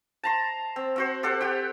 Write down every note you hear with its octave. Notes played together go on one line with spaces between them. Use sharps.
A5 A#5 C6
C4
C4 F#4 C5
G4 A4 C5 F#5
G4 F#5 G5